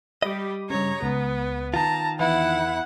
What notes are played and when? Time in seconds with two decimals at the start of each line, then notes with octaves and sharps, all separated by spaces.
0.22 G3 G4 D#5 B5 D6
0.70 G2 C#3 C#5 A#5
1.03 C#2 B3
1.74 D#3 F4 A5 A#5
2.19 E2 B3 E4 F#5